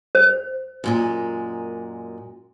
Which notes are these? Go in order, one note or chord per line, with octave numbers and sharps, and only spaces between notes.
C5
F#2 A#2 G#3